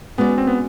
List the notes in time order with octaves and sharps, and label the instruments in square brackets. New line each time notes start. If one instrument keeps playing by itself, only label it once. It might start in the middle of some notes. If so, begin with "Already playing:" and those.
[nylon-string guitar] G#3 C#4 F#4 B4 D5 [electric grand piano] B3
[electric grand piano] C4
B3